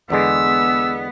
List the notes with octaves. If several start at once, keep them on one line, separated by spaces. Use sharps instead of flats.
E2 D3 G#3 B3 E6